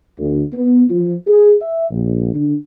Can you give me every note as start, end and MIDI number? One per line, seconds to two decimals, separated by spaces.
0.17 0.42 38
0.52 0.83 59
0.89 1.15 53
1.27 1.53 68
1.61 1.87 76
1.90 2.30 34
2.34 2.55 50